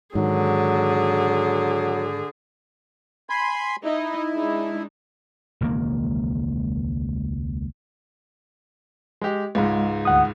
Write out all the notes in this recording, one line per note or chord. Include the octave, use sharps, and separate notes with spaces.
G#2 D3 D#3 F#3 G#4
G#5 B5 C6
D#4 E4 D#5
G#3 D4 D#4
E1 C#2 D#3 A#3
G#3 G4
C#2 G#2 G#3
D2 F#5 D#6